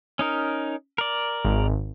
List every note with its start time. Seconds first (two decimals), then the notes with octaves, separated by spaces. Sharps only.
0.19 C#4 D#4 A#4
0.98 A#4 D5
1.45 G#1